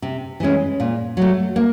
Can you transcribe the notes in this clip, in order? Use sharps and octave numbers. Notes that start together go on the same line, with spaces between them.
C3
E3 G#3 C#4
A#2
F#3 A3
A#3